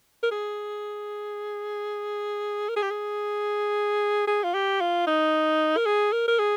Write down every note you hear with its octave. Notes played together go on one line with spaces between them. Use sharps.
A#4
G#4
A#4
G#4
G4
G#4
G#4
F4
G4
F4
D#4
A#4
G#4
A#4
A#4
G#4